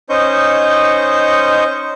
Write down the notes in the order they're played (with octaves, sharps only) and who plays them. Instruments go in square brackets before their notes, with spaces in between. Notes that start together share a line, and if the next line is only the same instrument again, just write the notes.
[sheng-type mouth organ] C#4 D#4 C5 D#5 C#6 G6